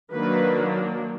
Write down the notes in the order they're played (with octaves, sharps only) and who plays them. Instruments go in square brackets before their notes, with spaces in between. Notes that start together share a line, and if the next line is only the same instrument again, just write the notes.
[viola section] D#3 F#3 A#3 D4 B4